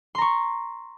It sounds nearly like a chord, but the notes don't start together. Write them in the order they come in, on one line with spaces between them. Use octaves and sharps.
C6 A#5 C#6